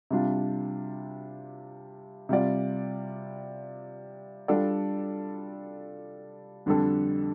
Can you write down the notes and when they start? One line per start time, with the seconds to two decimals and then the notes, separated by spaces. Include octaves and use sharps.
0.10 C3 G3 D4 F4
2.29 C3 G3 F4 D5
4.48 G3 D4 F4 A4 D5
6.66 F2 D3 G3 D4 A4